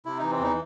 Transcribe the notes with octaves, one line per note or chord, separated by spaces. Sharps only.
C3 E4
E3 D#4
C4
E2 D#4